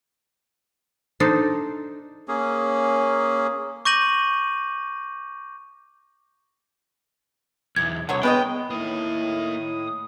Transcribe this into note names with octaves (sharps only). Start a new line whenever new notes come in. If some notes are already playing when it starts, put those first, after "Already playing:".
D4 D#4 A4 C5
A#3 C#4 G#4
C#6 D6 G6 A#6 D#7 F#7
B1 E2 G#6
C2 D3 F#3 C#5
G#3 B3 B4 D#5 G5
A2 A#3 D#4 E4 D#6